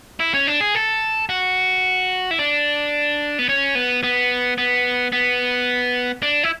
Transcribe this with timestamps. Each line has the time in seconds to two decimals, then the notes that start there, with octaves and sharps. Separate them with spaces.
0.20 E4
0.34 C#4
0.47 D4
0.61 G#4
0.75 A4
1.29 F#4
2.31 E4
2.39 D4
3.39 B3
3.49 C#4
3.75 B3
4.03 B3
4.58 B3
5.12 B3
6.22 D4
6.43 E4